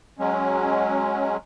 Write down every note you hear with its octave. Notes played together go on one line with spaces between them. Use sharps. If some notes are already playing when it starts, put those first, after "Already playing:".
F#3 G#3 C#4